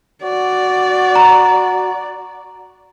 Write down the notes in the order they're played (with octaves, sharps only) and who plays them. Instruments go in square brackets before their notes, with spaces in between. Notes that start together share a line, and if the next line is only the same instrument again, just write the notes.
[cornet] F#4 [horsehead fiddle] D5
[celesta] A#5